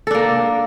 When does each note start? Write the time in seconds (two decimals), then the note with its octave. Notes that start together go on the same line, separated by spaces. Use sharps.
0.07 A4
0.11 D4
0.15 A#3